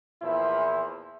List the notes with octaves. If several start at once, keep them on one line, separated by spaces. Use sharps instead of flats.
E2 A#2 F3 E4 C5